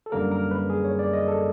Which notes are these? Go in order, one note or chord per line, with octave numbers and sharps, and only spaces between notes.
A4
F#2 D3 G3 A#3 A#4
A#4
B4
G#4
C#5
D5
D#5
A4